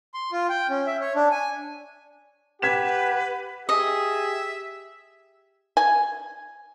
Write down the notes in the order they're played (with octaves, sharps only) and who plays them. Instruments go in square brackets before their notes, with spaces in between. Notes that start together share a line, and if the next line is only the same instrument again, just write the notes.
[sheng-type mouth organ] C6
F4
G5
C#4
E5
C#5
D4
G#5
[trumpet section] G4 [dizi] B4 [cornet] F#5 [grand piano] G#6 B6 E7
[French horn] G4 [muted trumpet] G#4 [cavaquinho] D#5 [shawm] E5
[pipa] G#5